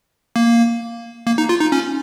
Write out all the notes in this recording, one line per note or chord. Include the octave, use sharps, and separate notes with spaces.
A#3
A#3
D#4
F4
D#4
C#4